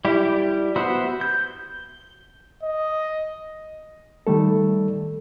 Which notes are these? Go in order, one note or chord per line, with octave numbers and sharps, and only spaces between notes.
G3 E4 G4
B3 F#4 C5 E5
G6
D#5
D#3 G3 A3 A4